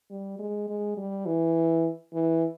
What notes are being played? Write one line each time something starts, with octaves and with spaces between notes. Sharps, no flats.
G3
G#3
G#3
G3
E3
E3